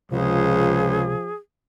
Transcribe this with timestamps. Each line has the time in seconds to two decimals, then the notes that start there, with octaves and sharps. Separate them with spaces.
0.12 C#2 C3 F3 G#4